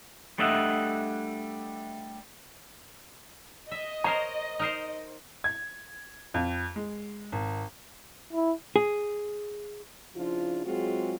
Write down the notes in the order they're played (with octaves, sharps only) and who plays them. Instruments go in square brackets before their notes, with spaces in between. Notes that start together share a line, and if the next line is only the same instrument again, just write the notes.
[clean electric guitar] G3 A3 D4 D#5 E5 F#5
[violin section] D#5 [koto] E5
[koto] A#4 C5 C#5 [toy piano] A#5
[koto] D#4 A#4 C5
[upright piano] G#6
F2
G#3
G#1
[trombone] E4
[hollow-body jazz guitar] G#4
[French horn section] C#3 F3 D4 E4 F4
F#3 G#3 C4 F4 F#4 G#4